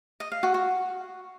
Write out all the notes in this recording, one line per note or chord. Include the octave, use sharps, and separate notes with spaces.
D#5
F5
F#4
F#4